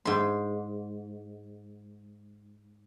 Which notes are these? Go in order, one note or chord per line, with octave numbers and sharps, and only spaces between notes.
G#2 C6